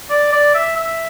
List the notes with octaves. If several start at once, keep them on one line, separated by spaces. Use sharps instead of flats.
D5
D5
E5
E5